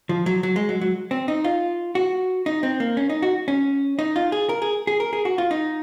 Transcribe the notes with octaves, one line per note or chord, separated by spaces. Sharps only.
F3
F#3
F#3
G#3
F#3
F#3
C4
D#4
F4
F#4
D#4
C4
A#3
C#4
D#4
F#4
C#4
D#4
F4
G#4
A#4
G#4
G#4
A#4
G#4
F#4
F4
D#4